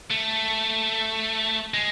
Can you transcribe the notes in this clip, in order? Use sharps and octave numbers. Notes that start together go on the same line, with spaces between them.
A3
G#3